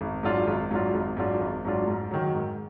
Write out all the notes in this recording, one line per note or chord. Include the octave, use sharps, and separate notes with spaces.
G#1
G#2 F#3 D4 F4
G#1
G#2 F#3 D4 F4
G#1
G#2 F#3 D4 F4
G#1
G#2 F#3 D4 F4
G#2
D#3 F#3
G#2